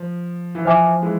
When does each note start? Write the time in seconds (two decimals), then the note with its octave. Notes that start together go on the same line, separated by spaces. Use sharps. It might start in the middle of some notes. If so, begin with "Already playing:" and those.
Already playing: F3
0.55 E3
0.65 F3 C5 E5 G#5 D6
1.02 E3 G#3